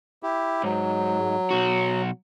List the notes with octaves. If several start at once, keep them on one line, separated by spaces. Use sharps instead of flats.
E4 G4
G#2 F#3
B1 F#4